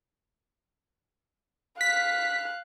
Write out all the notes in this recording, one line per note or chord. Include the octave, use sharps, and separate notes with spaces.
F5 F#6 B6